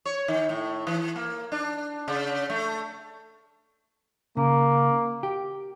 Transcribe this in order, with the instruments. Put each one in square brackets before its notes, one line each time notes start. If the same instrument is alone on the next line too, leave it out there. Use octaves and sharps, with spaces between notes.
[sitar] C#5
D#3
A2
E3
A#3
D4
C#3
A3
[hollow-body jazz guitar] C#3 [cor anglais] A#3
[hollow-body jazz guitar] G4